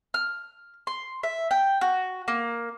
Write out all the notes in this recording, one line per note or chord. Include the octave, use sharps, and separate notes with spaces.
F6
C6
E5
G5
F#4
A#3